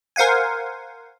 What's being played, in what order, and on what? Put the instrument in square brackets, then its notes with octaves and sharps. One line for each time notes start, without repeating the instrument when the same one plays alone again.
[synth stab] A#4 C5 F5 F#5 G#5